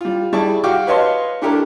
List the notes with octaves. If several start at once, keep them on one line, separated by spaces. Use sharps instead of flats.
G3 F4
G3 E4 G#4 D5 A5 C#6
F#4 G4 F5 G5 C#6 D6
B4 C#5 D#5 F5 A5 C6
A3 D4 E4 G4 A4 A#4